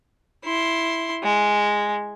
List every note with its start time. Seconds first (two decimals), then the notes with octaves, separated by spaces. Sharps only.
0.45 E4 C6
1.24 G#3